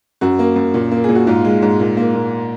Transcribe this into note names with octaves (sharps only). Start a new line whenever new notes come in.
F#2 F#4
A#3
F#2
A#2
A#3
A#2 G#4
F#4
G#2 F4
G#3
G#2
A#2
A#3
A#2